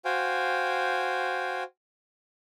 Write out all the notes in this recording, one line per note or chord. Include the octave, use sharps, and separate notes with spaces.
F#4 C5 F5 G5 G#5